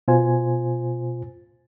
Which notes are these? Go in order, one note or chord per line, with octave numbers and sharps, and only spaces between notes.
B2 F4 C5 G#5